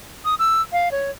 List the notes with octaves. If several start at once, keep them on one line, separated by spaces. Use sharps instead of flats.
D#6
E6
F5
C#5